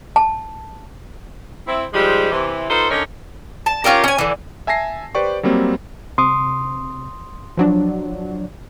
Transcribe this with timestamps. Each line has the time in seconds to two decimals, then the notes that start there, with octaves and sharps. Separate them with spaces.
0.16 A5
1.66 C4 E4
1.92 G#2 F3 G3 G#3
2.31 C3 E3
2.68 D#4 F4 A4 B4 C5
2.89 D3 D#3 C#4 D#4 A#4
3.66 A5
3.84 C#4 F4 G4 A#4
4.04 C#4 G#5
4.18 D3 E3
4.67 E5 G#5 A5 A#6 C7
5.15 G4 B4 C5 D5 G5 C#6
5.43 F#3 G3 A#3 C4
6.18 C3 C6 D#6
7.57 F3 F#3 D4